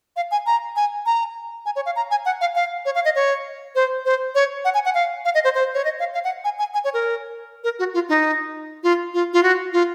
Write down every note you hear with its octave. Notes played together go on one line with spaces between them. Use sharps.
F5
G#5
A#5
G#5
A#5
G#5
C#5
F5
A#5
G#5
F#5
F5
F5
C#5
F5
D#5
C#5
C5
C5
C#5
F#5
G#5
F#5
F5
F5
D#5
C5
C5
C#5
D#5
F5
F5
F#5
G#5
G#5
G#5
C#5
A#4
A#4
F#4
F4
D#4
F4
F4
F4
F#4
F4